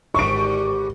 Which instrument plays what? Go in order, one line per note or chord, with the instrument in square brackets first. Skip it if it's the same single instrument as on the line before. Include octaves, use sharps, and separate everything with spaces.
[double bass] G#1 [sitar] G#2 D3 G3 [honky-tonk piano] C#6 D7